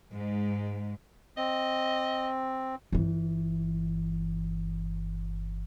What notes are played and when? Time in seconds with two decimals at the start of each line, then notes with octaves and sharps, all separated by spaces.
0.12 G#2
1.37 C4 D#5
2.92 G1 E3